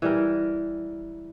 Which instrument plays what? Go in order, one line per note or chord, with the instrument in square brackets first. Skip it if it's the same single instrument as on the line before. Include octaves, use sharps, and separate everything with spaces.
[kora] E3 G3 A#4